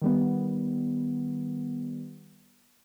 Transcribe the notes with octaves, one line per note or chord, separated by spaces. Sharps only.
D#3 G3 B3